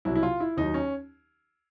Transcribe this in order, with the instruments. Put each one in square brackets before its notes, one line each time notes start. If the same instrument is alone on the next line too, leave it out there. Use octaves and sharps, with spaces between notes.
[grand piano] C2 B2 F#3 E4
E4
F4
E4
D#2 D#3 F#3 D#4
C#4